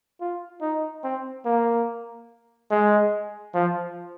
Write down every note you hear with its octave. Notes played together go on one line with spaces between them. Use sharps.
F4
D#4
C4
A#3
G#3
F3